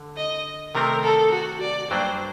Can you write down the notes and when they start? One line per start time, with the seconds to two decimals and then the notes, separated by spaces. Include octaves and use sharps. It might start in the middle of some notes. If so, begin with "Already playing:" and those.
Already playing: D3
0.17 D#5
0.75 C3 D#3 A3 C4 A#4
1.04 A4
1.32 F#4
1.61 D5
1.91 G2 F#3 A#3 D4 C5